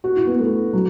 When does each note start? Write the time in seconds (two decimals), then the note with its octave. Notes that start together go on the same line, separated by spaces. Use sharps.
0.04 F#4
0.16 E4
0.27 B3
0.39 A3
0.73 F#3